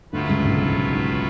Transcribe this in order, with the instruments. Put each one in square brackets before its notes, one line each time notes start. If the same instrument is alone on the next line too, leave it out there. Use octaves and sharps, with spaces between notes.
[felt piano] D2 D3 [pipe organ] A2 F#3 A3 F4 B4
[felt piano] C#2 C#3
B1 B2
G#2
G#2
G#2